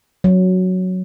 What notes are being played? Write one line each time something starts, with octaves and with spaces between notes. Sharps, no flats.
F#3